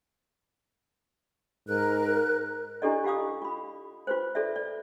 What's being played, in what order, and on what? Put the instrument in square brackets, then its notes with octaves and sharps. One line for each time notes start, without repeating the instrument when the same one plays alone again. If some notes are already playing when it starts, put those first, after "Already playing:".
[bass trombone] G#2 [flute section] A#4 F#6
[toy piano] D4 E4 G4 A4 D5 D#5
F4 G4 F5 D6 D#6
F4 B5
F4 B4 C5
F4 A4 D5 E5
D5